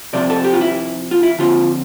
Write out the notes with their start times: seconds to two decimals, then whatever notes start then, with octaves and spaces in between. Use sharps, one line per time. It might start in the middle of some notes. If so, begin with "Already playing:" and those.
0.13 C3 F3 C4 D5
0.30 A4
0.44 G4
0.53 F4
0.61 E4
1.11 F4
1.23 E4
1.39 D3 F3 C4 F4